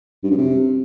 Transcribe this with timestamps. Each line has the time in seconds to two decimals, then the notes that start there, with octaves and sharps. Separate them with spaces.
0.24 G2
0.31 F#2
0.38 C3